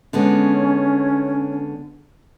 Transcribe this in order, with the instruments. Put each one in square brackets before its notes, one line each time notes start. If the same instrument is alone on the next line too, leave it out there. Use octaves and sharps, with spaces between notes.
[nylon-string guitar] D3 G#3 B3 [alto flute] C#4